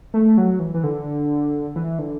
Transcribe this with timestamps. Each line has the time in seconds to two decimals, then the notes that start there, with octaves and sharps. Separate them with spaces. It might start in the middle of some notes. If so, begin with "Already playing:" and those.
0.14 A3
0.38 F#3
0.59 E3
0.74 E3
0.84 D3
1.76 E3
1.99 D3